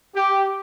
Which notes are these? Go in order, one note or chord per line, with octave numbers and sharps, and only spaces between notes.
G4